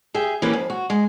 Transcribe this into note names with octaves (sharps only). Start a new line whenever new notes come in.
G4 G#4 E5
E3 A#3 C#4 G4 B4
F2
F#4
G#3